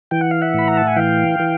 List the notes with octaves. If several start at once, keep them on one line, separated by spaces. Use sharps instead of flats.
E3 G5
F#5
F5
E5 F#5
A2 B5
A#5
A5
G#5
E3 F5 G5
E3